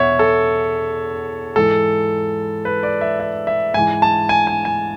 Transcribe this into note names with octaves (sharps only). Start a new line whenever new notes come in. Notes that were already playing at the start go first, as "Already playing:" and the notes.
Already playing: E2 B2 C#5 E5 F#5
A4
G#2 E3 A4
B4
D5
E5
E5
E5
G#2 E3 G#5
A5
G#5
G#5
G#5